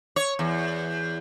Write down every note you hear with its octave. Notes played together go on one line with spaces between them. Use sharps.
C#5
E2